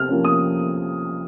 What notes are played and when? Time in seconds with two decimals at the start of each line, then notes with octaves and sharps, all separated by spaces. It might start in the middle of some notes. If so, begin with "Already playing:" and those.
Already playing: C3 F6
0.09 F3 A#3 C#4
0.25 D#6